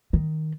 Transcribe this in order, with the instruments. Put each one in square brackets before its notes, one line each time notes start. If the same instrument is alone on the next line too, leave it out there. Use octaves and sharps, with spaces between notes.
[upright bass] D#3